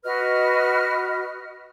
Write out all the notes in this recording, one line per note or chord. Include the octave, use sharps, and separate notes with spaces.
F#4 B4 D#5 F6